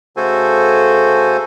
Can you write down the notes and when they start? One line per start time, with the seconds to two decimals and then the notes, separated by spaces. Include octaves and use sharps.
0.17 C#3 A3 F#4 A4 C5 G#5